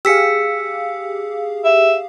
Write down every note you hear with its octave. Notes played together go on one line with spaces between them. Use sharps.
G4 G#4 F5 E6 B6 C#7
E5